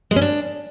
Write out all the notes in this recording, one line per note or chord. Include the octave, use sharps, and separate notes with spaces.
G#3
C#4
D4